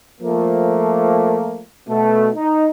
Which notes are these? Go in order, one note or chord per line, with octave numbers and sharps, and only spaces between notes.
F3 A3 A#3
B2 A3
D#4